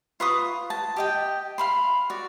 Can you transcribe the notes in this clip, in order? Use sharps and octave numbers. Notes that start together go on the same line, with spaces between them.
F4 B4 C#6 D#6
A5
G4 D#5 G5
F5 B5 C6
F#4 D5